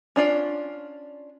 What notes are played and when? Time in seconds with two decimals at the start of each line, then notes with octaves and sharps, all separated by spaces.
0.16 C#4 D4 F4 D5